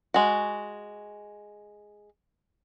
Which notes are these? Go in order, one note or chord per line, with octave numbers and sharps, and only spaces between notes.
G#3 F#4